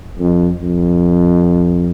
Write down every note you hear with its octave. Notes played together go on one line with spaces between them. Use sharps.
F2
F2